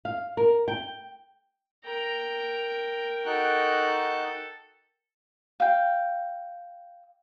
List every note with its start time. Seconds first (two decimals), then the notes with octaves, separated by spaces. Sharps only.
0.05 F5
0.37 A#4
0.68 G5
1.85 A#4 G5 A#5
3.26 D#4 F#4 A4 F#6
5.60 F5 G5